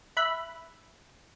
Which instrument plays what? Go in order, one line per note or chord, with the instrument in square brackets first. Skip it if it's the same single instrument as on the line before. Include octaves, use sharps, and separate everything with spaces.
[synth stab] E5 B5 F#6